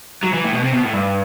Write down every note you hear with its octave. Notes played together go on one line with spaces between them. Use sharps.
F#3
E3
A2
B2
C3
B2
A2
G2